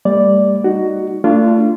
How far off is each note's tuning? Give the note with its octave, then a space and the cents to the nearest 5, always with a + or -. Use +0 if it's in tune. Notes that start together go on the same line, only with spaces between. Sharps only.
G3 +20 A#3 -40 D5 +0
D#4 -5 F#4 +10
A3 +30 D4 +0 F4 -25